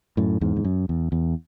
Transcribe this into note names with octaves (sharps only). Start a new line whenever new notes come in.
F#2 A2
E2 G#2
E2
F#2
E2
E2